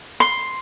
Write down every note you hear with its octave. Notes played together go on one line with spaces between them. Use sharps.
C6